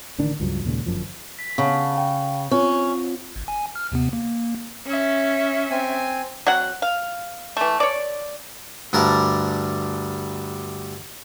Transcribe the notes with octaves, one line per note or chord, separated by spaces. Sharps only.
A1 D3 D#3 D4
C#2 G2 F3 F#3
D#2 A#2 C#3 G#3
G1 F#2 F3
B6
C#3 F5 F#5 A5
F5 G5
C4 C#4 F4
G#1
G#5
F6
D#2 C3 B3
A#3
C#4 E5
C4 G#5
F#3 C4 F#5
F5
E3 A3
C#5 D5
D2 G2 G3 A#4 A5